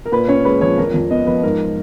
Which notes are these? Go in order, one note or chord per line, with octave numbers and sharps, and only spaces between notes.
A#4
A#2 B4
C#4 C#5
G#3 B4
F3 C#5
F2 A#4
F2
B3 D#5
F3 B4
G#2 A#4